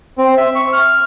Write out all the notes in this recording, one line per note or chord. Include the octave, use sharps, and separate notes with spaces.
C4
E5
C#6
F6